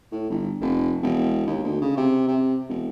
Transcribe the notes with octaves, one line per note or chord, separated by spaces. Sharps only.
A2
G1
F1
E1
D#2
D2
C#3
C3
C3
E1